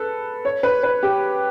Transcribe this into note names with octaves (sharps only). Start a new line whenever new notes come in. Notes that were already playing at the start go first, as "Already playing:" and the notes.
Already playing: A4 B4
C#5
B4
B4
G4